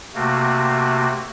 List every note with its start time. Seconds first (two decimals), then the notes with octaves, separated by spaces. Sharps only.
0.15 C3 A3 A#3 F#4